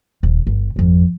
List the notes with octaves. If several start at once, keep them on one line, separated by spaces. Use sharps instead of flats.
D#1
G1
G#1 F2